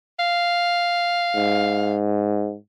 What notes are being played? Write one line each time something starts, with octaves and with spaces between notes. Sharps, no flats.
F5
G#2